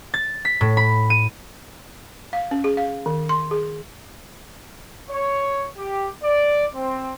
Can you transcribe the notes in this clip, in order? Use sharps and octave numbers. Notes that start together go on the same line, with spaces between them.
A6
B6
A2
B5
D#7
F5
C#4
G#4
F5
D#3
C6
G#4
C#5
G4
D5
C4